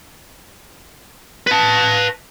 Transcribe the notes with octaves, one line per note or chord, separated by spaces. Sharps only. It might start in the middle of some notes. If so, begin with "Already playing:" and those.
B4 A5